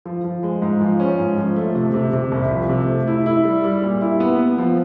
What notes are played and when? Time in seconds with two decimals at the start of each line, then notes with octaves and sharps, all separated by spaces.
0.05 F3
0.24 F3
0.43 G#3
0.62 G#2
0.81 F3
1.00 C#4
1.19 G#2
1.38 F3
1.56 A3
1.75 C3
1.94 C3
2.13 C3
2.32 C2
2.51 F3
2.69 C3
2.88 A3
3.07 E4
3.26 E4
3.45 G3
3.64 G3
3.82 A#2
4.01 E4
4.20 B3
4.39 B3
4.58 F3